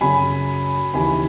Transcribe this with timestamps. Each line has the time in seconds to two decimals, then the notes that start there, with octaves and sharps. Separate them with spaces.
0.01 F#2 C#3 F#3 G#5 B5
0.94 D#2 C#3 E3 G#5 B5